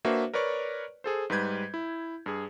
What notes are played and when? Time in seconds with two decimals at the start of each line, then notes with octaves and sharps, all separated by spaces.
0.05 A#3 D4 F#4 B4 C5 E5
0.34 A#4 B4 C#5 D5 C#6
1.04 G#4 A4 C5
1.30 G#2 G3 B4 G6 G#6
1.74 E4
2.26 G2 G#4